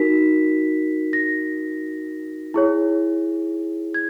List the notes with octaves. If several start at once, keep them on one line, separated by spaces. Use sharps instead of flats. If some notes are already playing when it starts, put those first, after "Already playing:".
Already playing: D#4 F#4 A#4 B6
A#6
E4 G#4 C#5
G#6